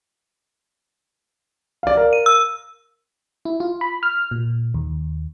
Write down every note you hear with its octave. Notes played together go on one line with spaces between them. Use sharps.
D5 F5
A#4 F5
D#7
E6
E4
F4
B5
F6
A#2
D#2